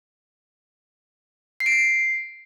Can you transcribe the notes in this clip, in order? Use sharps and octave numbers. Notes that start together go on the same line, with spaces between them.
C7
D7
C7